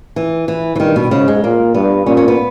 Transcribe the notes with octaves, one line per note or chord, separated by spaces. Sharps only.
E3
E3
E3
G2 D#3
B2
G#2 C#3
G#3
A#2 A#3
G2 B3
A#2 C#4
C#4
B3